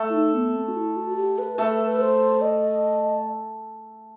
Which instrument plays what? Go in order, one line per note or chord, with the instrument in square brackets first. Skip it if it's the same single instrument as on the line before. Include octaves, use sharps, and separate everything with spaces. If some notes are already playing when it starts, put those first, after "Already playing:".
Already playing: [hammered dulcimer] A3 A4
[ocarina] E4
D#4
B3
C4
F#4
E4
F#4
F#4
G4
B4
[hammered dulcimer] A3 A4 [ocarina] B4
[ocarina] B4
C5
D#5